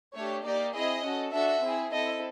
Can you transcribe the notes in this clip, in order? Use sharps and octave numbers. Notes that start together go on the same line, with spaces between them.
A3 D4 G4 C#5
A#3 D#4 G4 D5
C4 E4 G#4 D#5
C#4 F#4 A4
D4 F#4 A4 E5
C4 E4 G#4
C4 E4 A4 D#5